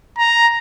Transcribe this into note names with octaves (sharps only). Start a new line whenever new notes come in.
A#5